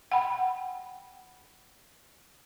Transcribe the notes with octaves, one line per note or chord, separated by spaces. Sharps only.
F#5 G5 B5